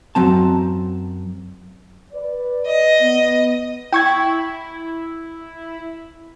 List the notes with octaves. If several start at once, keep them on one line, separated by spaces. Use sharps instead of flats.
F#2 F#3 C4 A5
B4 D5
D#5
B3
E4 G5 C#6 G#6